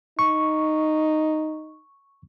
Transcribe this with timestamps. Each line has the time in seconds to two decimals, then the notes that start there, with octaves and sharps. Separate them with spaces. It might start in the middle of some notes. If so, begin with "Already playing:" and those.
0.19 D#4 C#6